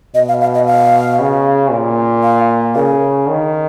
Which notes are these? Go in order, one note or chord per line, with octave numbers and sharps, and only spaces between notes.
B2 D#5
F5
F5
D#5
F5
C#3
A#2
F5
C#3 A#4
D#3